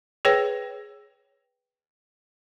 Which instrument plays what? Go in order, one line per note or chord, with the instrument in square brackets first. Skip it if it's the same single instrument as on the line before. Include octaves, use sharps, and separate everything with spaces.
[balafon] G#4 B4 C#5 G5